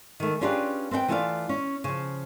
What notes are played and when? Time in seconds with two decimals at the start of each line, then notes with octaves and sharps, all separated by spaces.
0.20 D#3 A3
0.41 C#4 D4 F4 G4 G#4 B4
0.91 C4 B4 F#5 G5
1.08 E3 A3 F4 C#5 D5 F5
1.49 C#4
1.84 C#3 F3